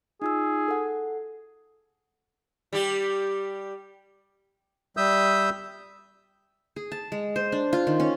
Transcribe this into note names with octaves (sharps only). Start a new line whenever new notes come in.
D#4 F4 G#4 E6
A4 F#5
G3 G4
G3 E5 D#6 E6 G6
G#4
A5
G#3
C5
D4
F4
D#3
C#4